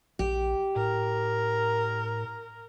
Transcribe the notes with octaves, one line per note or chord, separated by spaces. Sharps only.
A#1 G4
A2 A#4